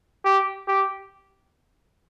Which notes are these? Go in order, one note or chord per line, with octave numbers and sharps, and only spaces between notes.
G4
G4